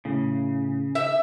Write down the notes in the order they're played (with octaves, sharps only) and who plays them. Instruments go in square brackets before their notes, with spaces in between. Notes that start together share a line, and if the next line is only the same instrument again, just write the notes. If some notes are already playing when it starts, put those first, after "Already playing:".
[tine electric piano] A2 [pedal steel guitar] C#3
[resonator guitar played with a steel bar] E5 [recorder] E6